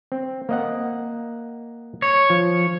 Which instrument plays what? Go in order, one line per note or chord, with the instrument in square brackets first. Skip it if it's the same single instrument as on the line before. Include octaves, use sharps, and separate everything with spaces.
[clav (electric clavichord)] C4
A#3 D#5 F#5
[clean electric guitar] C#5
[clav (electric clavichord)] F3